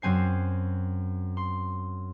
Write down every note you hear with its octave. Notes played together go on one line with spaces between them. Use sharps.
F#2 F#3 C4 G#5 C7
C6